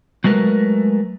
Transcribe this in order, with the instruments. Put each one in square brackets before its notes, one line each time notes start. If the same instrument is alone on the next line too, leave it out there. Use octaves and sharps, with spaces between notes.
[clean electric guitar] F#3 G#3 A3 A#4 B4